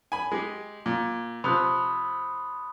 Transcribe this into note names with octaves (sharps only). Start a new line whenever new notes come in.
G#5 B5
G#3 G4
A#2
C3 F3 B5 D#6 F#6